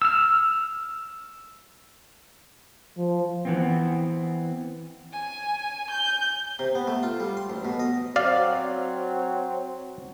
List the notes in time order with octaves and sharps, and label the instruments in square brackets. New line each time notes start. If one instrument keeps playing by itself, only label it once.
[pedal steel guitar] E6 F6
[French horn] F3
[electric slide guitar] E3 B3 C4
[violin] G#5
G6
[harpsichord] C3
B3
A3
F4
G3
C6
A1
B2
D#5
[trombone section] F#3 C4 [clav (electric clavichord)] D5 F5